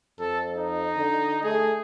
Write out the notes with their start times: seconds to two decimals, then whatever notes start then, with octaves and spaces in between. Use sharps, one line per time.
0.20 F2 A4
0.53 D#4
0.97 D3
1.43 A3 G#4